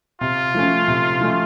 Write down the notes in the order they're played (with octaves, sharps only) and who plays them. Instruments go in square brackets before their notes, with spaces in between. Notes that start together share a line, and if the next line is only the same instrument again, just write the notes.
[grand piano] C3 [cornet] F4
[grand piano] F3 A3 C#4
C3
F3 A3 C#4